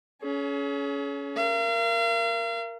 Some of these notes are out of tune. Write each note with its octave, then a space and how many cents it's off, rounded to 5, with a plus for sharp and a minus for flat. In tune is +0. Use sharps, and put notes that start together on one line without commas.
C#4 +20 G#4 +45
A#4 +0 F5 -40